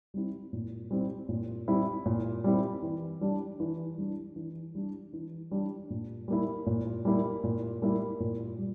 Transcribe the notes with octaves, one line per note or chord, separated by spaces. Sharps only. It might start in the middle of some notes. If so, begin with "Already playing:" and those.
G3 C4 E4
A#2
G3 C4 E4
A#2
G3 C4 E4
A#2
G3 C4 E4
E3
G3 D4
E3
G3 D4
E3
G3 D4
E3
G3 D4
A#2
G3 A#3 E4
A#2
G3 A#3 E4
A#2
G3 A#3 E4
A#2
G3